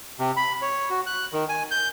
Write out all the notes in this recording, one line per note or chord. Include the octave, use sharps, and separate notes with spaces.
C3
B5
C#5
F#4
F#6
D#3
G#5
G6